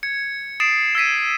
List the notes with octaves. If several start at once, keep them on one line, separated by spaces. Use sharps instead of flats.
G#6 C#7
D#6 A6 C7 D7 E7
E6 G#6 B6 D#7